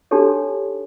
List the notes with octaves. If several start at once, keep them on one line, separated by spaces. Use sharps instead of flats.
D4 D#4 F#4 G4 A4 C#5